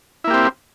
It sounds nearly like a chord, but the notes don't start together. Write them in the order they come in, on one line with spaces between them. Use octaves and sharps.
E4 A#3 G4 C4